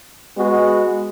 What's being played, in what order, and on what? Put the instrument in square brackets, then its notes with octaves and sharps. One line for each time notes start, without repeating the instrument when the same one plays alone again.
[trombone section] G#3 B3 F#4